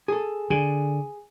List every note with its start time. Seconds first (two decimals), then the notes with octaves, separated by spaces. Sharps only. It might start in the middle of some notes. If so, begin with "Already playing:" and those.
0.08 G#4 A4
0.50 D3 G#4